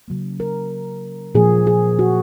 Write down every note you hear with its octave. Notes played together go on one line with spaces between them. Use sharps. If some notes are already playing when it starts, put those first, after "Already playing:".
C#3 F#3 A#3
A#4
A#2 F3 A#3 G#4
G#4
F#4